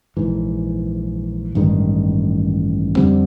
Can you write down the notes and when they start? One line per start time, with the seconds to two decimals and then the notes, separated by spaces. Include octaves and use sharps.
0.17 A#1 G#2 E3
1.55 A1 G2 D#3 G#3
2.96 F2 D3 G3 C4